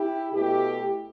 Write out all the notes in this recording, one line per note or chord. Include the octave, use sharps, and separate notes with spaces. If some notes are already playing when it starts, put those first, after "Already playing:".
Already playing: E4 G4
B2 A3 E4 G4